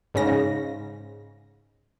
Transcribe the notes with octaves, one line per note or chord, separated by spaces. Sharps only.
G#2 C#3 A#6